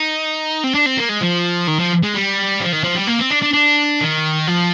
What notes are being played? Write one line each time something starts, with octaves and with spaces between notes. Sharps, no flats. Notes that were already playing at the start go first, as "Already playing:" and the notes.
Already playing: D#4
C4
D4
C4
A#3
G#3
F3
D#3
F3
G#3
G3
F3
D#3
F3
G3
A#3
C4
D4
D4
D4
D#3
F3